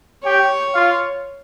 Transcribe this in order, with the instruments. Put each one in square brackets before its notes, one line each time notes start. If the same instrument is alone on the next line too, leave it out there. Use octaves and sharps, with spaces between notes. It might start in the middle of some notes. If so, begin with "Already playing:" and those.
[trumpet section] G4 G5 [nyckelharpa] C#5
[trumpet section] F4 F5